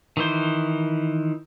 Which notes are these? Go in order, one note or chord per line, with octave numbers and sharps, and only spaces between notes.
D#3 E3 C5